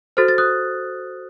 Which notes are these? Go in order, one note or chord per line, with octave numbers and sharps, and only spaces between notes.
F#4 A4 C5 F6 A6
A6
D#6 F#6